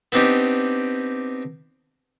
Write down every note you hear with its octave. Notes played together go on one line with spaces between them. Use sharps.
B3 C4 D4 D#4 G4